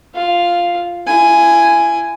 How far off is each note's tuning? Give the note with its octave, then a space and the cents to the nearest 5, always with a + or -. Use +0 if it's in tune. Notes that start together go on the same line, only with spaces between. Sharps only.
F4 +0 F5 +0
E4 +35 G#5 +0